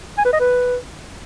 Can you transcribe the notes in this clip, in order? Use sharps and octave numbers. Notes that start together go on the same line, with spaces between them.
G#5
B4
D#5
B4